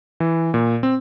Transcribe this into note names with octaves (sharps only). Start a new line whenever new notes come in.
E3
A#2
C4